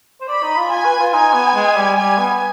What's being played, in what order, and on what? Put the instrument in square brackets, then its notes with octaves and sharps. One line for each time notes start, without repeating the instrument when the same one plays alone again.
[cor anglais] C5
[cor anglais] D5 [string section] B5
[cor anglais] D#4
F4
[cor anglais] F4 [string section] G#5
[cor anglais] B4
F4
[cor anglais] D#4 [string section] G#5
[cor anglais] B3
G#3
G3
[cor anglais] G3 [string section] G#5
[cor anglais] B3